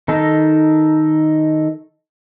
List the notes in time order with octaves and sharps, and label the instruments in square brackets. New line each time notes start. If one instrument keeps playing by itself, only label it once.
[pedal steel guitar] D#3 D#4 A4 A#4